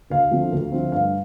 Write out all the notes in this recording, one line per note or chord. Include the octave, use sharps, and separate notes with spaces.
D2 F5
D3 F3 A3 C4
D2
D3 F3 A3 C4
G2 F5